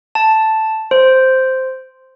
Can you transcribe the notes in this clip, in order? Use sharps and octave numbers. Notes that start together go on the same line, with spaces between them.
A5
C5